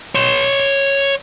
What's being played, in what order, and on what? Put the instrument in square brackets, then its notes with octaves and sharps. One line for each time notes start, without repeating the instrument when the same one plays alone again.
[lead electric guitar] C#5 C6